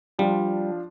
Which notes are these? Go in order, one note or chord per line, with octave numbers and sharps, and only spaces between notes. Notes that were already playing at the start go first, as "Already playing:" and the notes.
F3 G3 D4 F4